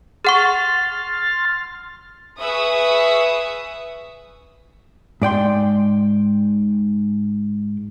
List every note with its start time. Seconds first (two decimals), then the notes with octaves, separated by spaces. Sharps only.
0.25 G#4 F#5 C6 C#6 F6 A6
2.40 G#4 B4 E5 C#6 D#6
5.22 G#2 D5 G5 C6